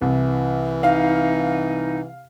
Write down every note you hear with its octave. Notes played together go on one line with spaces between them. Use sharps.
C2 E3
D#4 F5